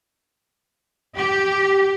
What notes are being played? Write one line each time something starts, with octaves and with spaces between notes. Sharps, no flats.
G4